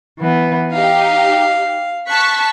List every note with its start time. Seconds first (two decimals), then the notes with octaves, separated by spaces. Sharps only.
0.20 E3 B3
0.72 D#4 G4 F5
2.09 A5 C#6 F#6 B6